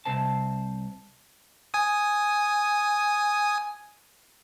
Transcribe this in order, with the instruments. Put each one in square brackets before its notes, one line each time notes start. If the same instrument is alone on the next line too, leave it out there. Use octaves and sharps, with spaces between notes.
[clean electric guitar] C2 C3 C4 C5 A5
[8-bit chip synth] G#5 D#6